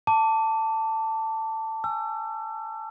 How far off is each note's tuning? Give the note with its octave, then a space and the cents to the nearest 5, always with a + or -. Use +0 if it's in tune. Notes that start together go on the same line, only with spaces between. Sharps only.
A5 +15 D6 -20
G#5 +0 E6 +35